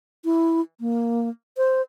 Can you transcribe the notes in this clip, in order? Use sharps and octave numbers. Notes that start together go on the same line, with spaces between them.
E4
A#3
C5